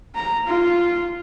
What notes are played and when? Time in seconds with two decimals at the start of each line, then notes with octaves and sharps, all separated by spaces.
0.15 A#5
0.47 F4